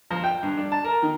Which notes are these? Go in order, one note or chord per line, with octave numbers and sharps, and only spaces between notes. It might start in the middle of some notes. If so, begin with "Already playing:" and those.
F3
G5
G2
D4
A5
A#4
D#3